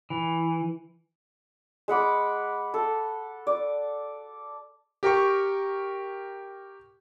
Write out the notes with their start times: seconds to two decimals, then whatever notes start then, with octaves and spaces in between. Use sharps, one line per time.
0.10 E3
1.88 G#3 F#5 B5 D6
2.74 A4
3.47 D5
5.03 G4 A#4 G5 C#6